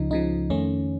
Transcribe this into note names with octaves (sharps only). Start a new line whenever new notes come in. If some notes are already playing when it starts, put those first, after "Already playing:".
Already playing: C#2 C#3 F3 D#4
C#2 C#3 F3 D#4
F2 D#3 A3 C#4